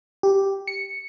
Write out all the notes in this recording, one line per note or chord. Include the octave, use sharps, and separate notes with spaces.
G4
C#7